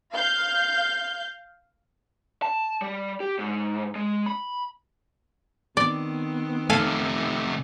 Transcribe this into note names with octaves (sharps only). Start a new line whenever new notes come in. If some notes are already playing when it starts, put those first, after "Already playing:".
F5 G6
A5
G3
G4
G#2
G#3
B5
D#3 B3 C4 D5
C3 A3 A4 F5 G#5